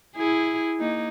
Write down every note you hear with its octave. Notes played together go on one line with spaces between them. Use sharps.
E4 G#4
A#3 D#4